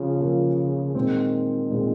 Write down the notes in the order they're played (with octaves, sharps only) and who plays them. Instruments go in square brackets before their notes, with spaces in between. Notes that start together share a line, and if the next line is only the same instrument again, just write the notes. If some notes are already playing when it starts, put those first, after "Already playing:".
Already playing: [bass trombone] C#3 [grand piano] F3 F4
[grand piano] F3 A#3 F4 G#4
[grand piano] A#2 G#3 C4 [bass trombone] D#3
[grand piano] A#2 G#3 C4